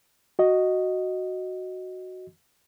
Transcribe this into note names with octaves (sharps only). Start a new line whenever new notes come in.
F#4 D#5